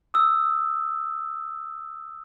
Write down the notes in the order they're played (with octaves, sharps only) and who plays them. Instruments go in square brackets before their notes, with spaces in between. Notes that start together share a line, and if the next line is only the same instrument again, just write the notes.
[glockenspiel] D#6 E6